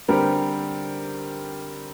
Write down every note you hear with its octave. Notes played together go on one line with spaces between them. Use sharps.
D3 G3 C4 G4 A#4